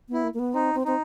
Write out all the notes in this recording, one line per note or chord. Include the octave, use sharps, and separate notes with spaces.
B3 E4
A#3
A#3
B3
C4 D#4
C4
C4 D#4